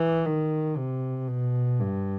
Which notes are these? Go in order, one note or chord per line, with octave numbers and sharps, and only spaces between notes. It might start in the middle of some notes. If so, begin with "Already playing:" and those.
Already playing: E3
D#3
C3
B2
G2